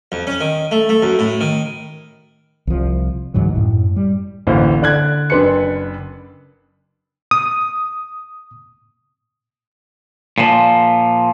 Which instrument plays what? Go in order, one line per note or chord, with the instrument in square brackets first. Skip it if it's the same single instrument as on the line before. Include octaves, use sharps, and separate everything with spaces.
[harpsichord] F2
C#4
D#3
A3
A3
F#2
A2
D#3
[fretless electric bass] C2 F3
D2 G#2 E3 F#3
F#2 A2
G3
[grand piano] A1 D2 A#3 E4 C5 F5
D3 D5 F#6 G#6
F#1 D4 B4 C6 C#7
[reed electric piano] D#6
[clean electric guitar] A#2 F3